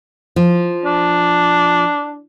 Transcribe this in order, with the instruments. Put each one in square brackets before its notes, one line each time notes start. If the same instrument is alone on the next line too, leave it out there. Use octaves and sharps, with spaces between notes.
[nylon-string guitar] F3
[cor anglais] D4